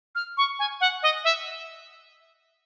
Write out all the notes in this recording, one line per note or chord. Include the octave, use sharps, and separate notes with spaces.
F6
C#6
G#5
F#5
D#5
E5